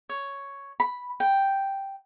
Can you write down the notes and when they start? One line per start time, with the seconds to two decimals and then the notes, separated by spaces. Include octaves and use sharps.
0.09 C#5
0.80 B5
1.20 G5